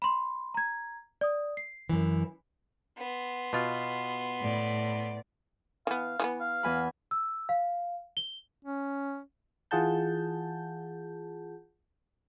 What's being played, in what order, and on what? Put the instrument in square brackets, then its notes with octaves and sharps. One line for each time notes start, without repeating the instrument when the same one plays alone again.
[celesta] B5 C6
A#5 G#6
D5 D#6
C7
[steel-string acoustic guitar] F#2 E3
[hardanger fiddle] B3 C6
[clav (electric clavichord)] B2 F4
[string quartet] A2 D5
[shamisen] E3 B3 [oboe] F5
[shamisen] E3 A3 B3
[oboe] F5
[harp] E2 G#5 B5
[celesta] E6
F5
G7
[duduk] C#4
[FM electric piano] E3 F4 G#4 F#5 A5 G6